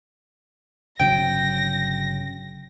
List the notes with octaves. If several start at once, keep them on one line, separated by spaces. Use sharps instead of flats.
G1 C#3 F#3 G5 A#6